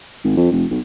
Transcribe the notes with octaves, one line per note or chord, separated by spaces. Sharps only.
G#1
F2
F1
B1